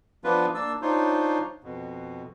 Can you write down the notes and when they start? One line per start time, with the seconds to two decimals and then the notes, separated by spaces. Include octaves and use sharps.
0.24 F3 B3 D4 F4 B4
0.54 A#3 D4 A5 E6
0.82 D4 D#4 F4 C5 C#5
1.64 F2 B2